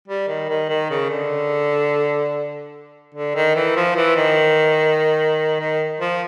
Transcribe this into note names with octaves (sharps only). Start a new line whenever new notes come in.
G3
D#3
D#3
D#3
C#3
D3
D3
D#3
E3
F3
E3
D#3
D#3
F3